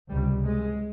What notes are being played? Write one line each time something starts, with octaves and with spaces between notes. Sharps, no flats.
C#2 C3 G3
G#3